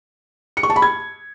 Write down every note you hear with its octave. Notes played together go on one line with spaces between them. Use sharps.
C#7
C#6
A5
B5
G#6